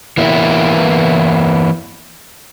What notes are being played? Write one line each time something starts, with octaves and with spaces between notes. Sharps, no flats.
E3 A#3 B3 E4